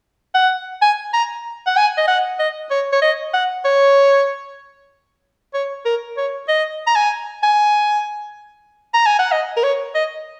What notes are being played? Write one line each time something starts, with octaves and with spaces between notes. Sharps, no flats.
F#5
G#5
A#5
F#5
G#5
D#5
F#5
D#5
C#5
C#5
D#5
F#5
C#5
C#5
A#4
C#5
D#5
A#5
G#5
G#5
A#5
G#5
F#5
D#5
A#4
C#5
D#5